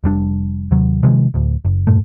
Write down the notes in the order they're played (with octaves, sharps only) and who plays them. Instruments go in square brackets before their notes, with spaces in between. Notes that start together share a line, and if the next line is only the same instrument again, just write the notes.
[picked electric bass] F1 G3 D4
D#2 C3 F#3
C3 D#3 F3 G#3
D1 D2
F#1
E1 G2 A#2 A3